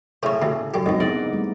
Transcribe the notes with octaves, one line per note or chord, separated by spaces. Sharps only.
A2 C#3 C5 C#5
D2 C3
F#2 G4
C#2 F#2 C4 D#4 D#5
G#2 B3 D#4 E4 D5
G3 A3